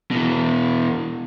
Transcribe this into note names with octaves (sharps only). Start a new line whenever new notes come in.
B2 E3